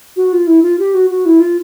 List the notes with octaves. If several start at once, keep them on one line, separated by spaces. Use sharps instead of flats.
F#4
F4
E4
F4
G4
F#4
F#4
E4
F4